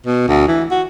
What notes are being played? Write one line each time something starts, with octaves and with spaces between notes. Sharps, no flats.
B2
D2
E3
F#4